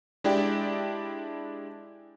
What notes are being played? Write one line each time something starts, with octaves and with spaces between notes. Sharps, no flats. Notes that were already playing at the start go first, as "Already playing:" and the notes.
G#3 D4 E4 G4 D5 G5